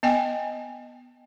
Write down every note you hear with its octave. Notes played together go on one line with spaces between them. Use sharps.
B3 D#5 G5 G#5